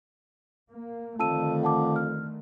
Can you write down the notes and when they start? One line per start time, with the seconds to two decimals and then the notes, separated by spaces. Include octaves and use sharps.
0.70 A#3
1.19 F2 D3 D#3 A3 A5 E6 D#7
1.63 F#5 A5 D6
1.96 F6